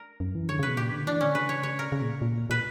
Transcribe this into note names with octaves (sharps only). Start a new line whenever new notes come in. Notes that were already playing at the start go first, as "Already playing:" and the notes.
Already playing: A#4
F#2
E3
D3 C#5
C#3 B4
B2
A#2 G4
D3
E3 D4
D3 C#4
C#3 B4
C#5
C#5
A#4
C#3
A#2
A#2
A#2 B4